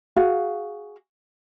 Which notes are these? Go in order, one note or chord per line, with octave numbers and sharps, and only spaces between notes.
F#4 G#4 F5